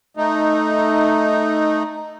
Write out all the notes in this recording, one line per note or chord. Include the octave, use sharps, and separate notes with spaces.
A3 D#4